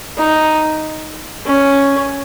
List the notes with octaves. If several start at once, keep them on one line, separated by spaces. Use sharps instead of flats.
D#4
C#4